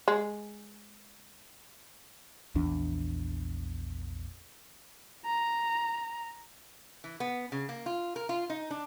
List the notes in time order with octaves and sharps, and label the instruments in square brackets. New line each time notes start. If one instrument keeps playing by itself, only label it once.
[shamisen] G#3
[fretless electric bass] A#1 E2 D4
[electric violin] A#5
[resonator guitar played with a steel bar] E3
B3
C#3
A#3
F4
A#4
F4
D#4
D4